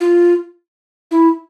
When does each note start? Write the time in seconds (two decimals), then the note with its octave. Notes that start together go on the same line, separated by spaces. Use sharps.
0.01 F4
1.11 E4